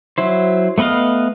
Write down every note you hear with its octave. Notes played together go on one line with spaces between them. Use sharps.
F#3 E4 C5
A3 B3 B4 D#5 F5